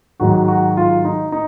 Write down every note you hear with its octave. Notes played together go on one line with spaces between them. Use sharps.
G#2 D#3 F#3 F#4
F#4
F4
D#4
D#4